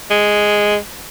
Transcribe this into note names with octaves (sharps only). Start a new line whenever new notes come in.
G#3